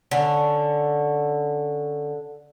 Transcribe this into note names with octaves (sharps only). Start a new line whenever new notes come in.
D3 C#4